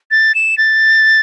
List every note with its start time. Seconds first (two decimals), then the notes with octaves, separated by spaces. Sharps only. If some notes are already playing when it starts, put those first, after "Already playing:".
0.11 A6
0.35 E7
0.58 A6